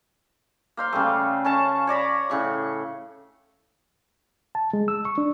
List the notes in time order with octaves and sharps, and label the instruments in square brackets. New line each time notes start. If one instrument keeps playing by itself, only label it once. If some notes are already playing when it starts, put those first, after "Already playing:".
[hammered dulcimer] A#3 C5 F5
C#3 G3 A3
C#4 A#4 A5 C#6
C#5 D5 A#5 B5
A2 C#3 C#6
[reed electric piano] A5
G#3
E6
C#6
D4